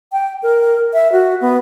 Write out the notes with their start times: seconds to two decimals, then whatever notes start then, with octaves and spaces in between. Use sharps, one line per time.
0.13 G5
0.43 A#4
0.93 E5
1.12 F#4
1.41 B3